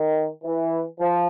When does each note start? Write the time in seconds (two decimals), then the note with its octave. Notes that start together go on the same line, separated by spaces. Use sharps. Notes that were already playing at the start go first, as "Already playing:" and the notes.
Already playing: D#3
0.43 E3
0.99 F3